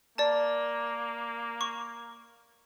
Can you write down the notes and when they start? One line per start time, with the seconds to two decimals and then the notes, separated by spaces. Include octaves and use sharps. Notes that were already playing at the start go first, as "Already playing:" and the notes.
0.18 A#3 D5 A5
1.61 C#6